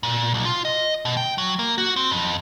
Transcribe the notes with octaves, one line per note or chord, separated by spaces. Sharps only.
A#2
B1
F4
D#5
B2
G5
F#3
A#3
F#4
C4
F2